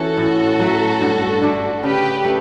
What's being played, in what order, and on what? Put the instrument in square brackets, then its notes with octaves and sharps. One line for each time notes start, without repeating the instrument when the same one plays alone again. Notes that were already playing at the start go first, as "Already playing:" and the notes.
Already playing: [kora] E3 C#4 [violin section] F#4 A4
[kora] A2
F#3 A3
G2
D3 A3 D4
[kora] C#3 [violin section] G4 B4
[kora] A3